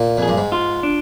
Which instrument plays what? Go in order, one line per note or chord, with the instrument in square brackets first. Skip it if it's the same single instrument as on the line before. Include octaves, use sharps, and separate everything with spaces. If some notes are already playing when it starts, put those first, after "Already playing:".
Already playing: [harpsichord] A#2
[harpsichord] F2 [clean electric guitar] G#4
[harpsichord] G2
G#2
[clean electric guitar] F4
D4